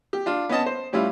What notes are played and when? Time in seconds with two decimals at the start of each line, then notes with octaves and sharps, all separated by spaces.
0.13 G4
0.26 D4 F4
0.49 B3 C#4 D#5 A5
0.66 C5
0.92 A2 G3 C#4 E4 F4